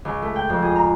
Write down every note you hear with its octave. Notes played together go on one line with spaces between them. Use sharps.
C#2
A3
G5
F2
G#4
A#5